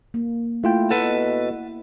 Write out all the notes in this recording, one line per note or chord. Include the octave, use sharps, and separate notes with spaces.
A#3
A3 E4 F4 G5
B2 A4 B4 F#5